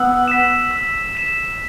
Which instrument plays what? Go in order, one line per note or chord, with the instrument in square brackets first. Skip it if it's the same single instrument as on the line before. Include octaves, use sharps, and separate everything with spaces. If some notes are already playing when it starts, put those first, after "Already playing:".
Already playing: [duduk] B3 [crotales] E6
[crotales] B6 E7
E6
B6 E7